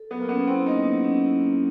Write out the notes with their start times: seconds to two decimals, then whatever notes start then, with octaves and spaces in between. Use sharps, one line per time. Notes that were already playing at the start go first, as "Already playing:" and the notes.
Already playing: A4
0.11 F#3 B3
0.21 A#3
0.29 B3 C#4
0.47 C4 E4
0.66 A#3 D#4
0.85 F#3
1.04 C#4
1.23 E4
1.41 A#3